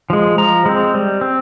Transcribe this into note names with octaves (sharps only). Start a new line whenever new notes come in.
F3 G#3
F3 A#5
G#3 C4
G3
C4